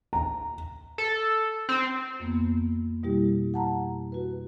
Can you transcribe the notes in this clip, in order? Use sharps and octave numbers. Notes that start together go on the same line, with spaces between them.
A#5
A4
C4
F2 A#3 B3
B2 G3 E4 G4
F#5 A5 A#5
F#4 B4